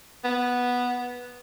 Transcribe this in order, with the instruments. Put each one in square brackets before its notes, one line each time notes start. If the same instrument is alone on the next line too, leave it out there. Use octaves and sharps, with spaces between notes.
[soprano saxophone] B3